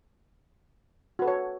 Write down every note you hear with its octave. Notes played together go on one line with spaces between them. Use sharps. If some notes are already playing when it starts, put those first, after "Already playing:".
F#4 A4 B4 C#5